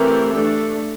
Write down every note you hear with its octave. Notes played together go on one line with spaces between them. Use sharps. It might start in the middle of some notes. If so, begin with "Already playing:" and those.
Already playing: E3 A3 C4 G4 A#4
A3 D4 A4